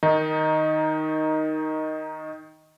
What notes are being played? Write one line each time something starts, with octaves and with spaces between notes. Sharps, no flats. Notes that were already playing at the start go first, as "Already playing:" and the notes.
D#3 D#4